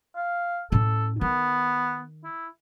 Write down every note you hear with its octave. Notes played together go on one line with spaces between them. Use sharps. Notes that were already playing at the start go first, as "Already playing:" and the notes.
F5
A2 C#4 A4
D#3 B3
E4